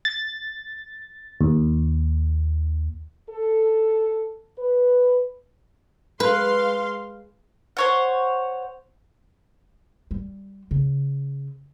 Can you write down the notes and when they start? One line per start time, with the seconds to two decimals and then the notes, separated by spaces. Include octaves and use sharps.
0.05 A6
1.41 D#2
3.30 A4
4.58 B4
6.20 G#3 B4 F5 C6
7.77 C5 C#5 F#5
10.11 G3
10.71 C#3